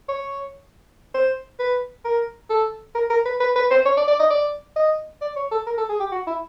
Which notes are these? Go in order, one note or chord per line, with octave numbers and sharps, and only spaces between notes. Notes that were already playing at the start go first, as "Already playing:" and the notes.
C#5
C5
B4
A#4
A4
A#4
A#4
B4
B4
B4
C5
C#5
D5
D5
D#5
D5
D#5
D5
C#5
A4
A#4
A4
G#4
G4
F#4
E4